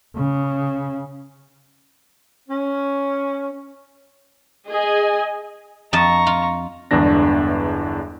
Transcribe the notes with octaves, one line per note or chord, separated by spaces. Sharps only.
C#3
C#4
G#4 D#5 G#5
F2 D#5 A5 A#5 C#6
F4
G1 E2 E3 G#3 D4 A#6